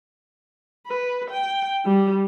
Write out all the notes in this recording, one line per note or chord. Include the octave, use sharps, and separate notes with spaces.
B4
G5
G3